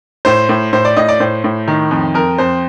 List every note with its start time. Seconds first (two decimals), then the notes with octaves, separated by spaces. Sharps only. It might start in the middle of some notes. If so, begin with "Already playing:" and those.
0.25 A2 C5
0.49 A2
0.73 A2 C5
0.85 D5
0.97 A2 D#5
1.08 D5
1.20 A2 C5
1.44 A2
1.68 D#3
1.91 F2
2.14 F2 A#4
2.38 F2 C5